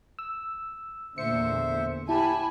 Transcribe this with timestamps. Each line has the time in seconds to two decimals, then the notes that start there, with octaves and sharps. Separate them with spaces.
0.19 E6
1.18 E2 A#2 D3 C5 E5 C#7
2.09 E4 G4 G#5 A5 B5